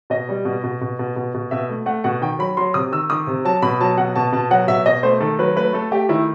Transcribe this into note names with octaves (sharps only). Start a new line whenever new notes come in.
B2 D#5
G3
B2
B2
B2
B2
B2
B2
B2 E5
A3
A3 F#5
B2 F#5
D#3 G5
F#3 B5
F#3 C6
C3 D#6
D#3 E6
D#3 D#6
C3
F#3 A5
B2 B5
F#3 A5
B2 F#5
B2 A5
B2 A5
F#3 F#5
B2 E5
B2 D#5
A3 C5
D#3 A4
F#3 B4
A3 B4
A3 A4
A3 G4
D#3 E4